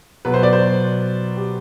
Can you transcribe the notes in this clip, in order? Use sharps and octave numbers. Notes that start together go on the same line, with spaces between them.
B2 F#3 B4
C5
D5
C5
G4